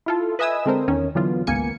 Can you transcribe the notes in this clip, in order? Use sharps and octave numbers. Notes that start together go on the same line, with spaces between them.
E4 F4 A4
B4 D#5 E5 G#5 D#6 E6
D3 G#3 C4 A4 A#4 C5
E2 D#3 C#4
D3 E3 F#3 B3 F4
G#1 C#2 A#3 B3 G#5 C#7